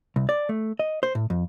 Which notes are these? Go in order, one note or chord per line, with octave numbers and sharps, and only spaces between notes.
C2
D5
A3
D#5
C5
A2
F2